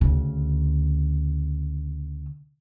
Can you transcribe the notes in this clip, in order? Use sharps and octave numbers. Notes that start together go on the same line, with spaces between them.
D2 C#3